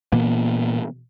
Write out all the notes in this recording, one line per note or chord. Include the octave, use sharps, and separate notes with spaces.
A#2 E3 A#3 B3